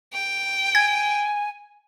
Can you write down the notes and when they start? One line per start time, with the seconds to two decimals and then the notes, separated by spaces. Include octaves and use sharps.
0.14 G5
0.75 G#5 G#6